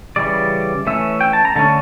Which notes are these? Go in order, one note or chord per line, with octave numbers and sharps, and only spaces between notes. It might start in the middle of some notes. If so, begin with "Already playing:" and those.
C#3 E3 G3 D5
E3 A3 C#4 E5
G5
A5
A#5
D3 A3 C#4 A5